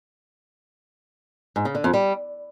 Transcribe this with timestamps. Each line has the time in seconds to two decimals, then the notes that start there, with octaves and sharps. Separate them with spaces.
1.56 G#2
1.65 C#3
1.75 D3
1.84 F2
1.94 G3